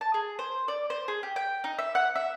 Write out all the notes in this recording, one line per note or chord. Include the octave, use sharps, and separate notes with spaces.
A5
G#4
C5
D5
C5
G#4
G4
G5
D#4
E5
F#5
E5